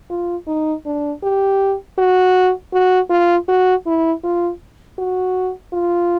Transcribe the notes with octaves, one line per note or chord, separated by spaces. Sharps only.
F4
D#4
D4
G4
F#4
F#4
F4
F#4
E4
F4
F#4
F4